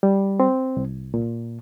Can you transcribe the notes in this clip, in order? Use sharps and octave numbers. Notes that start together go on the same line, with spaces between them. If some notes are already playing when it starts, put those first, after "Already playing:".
G3
C4
C2
A#2